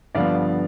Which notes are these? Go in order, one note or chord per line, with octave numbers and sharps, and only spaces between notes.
G2 D3 F3 B3 D5 F5